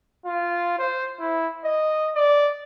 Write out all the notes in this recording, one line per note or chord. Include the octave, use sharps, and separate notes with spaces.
F4
C5
E4
D#5
D5